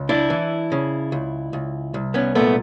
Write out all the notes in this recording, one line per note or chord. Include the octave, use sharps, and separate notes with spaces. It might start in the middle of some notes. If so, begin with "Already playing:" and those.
Already playing: C#2
D4 E4
E3
C#3
C#2
C#2
C2
B3 C#4
A#2 A3 B3